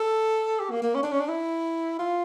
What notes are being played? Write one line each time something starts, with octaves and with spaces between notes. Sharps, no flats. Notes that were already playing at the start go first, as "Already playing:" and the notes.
Already playing: A4
G4
A#3
A#3
C#4
D4
C#4
D4
E4
F4